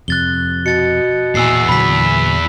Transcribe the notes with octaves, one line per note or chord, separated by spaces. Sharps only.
F2 C3 F#6 A6 G7
B2 A6 C#7
E2 A#2 G#5 E6 C7
A#2 D3 F#3 B5 B6